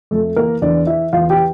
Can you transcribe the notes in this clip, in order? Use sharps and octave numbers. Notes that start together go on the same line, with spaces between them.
F2 A3 A4
E3 A#3 A#4
E2 D4 D5
E3 E4 E5
E2 F4 F5
G4 G5
E3